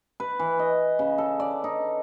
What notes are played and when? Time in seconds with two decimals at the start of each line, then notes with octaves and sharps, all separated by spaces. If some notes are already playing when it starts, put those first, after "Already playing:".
0.20 B4
0.39 E3
0.59 D#5
0.99 C#3
1.18 A4
1.40 D5
1.64 D#4